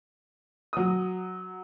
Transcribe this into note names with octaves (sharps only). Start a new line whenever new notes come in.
F#3 D#6